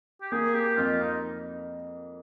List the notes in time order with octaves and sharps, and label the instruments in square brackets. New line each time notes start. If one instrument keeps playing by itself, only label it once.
[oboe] G4
[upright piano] A#3 [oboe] G#4
[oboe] G4
[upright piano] F2 [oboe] F4
[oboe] D#4